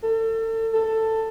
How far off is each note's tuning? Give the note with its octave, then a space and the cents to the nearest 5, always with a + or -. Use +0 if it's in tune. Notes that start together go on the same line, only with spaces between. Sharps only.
A4 +35
A4 +15